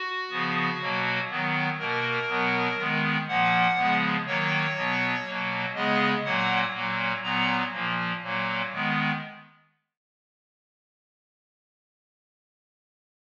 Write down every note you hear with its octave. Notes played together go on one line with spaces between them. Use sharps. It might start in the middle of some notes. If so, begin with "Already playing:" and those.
Already playing: F#4
C#3 F3 B3
B2 F#3 A#3
D#3 F#3 B3
B2 A#3 A#4
B2 F#3 B3
D#3 G#3 B3
A#2 F3 A#3 F#5
C#3 F3 G#3 B3
D#3 F#3 A#3 C#5
B2 F#3 B3
B2 F#3 A#3
C#3 G#3 B3 D#5
A#2 F#3 A#3 F#5
A#2 F#3 A#3
A#2 F#3 B3 A#5
A#2 F3 A#3
A#2 F#3 A#3
D#3 G#3 B3